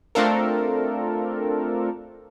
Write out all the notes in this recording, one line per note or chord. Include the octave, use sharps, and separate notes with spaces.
A3 C4 D4 F4 A4 A#4